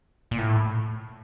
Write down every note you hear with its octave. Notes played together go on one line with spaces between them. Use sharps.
A#2
A2